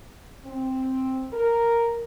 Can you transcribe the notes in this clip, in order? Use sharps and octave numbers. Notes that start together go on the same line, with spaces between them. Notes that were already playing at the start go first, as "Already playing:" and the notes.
C4
A#4